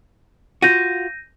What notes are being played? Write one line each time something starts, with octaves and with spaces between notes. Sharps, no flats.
F4 F#4 G6 A#6 D#7